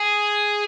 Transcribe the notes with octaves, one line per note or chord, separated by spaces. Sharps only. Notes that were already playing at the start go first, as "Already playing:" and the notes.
Already playing: G#4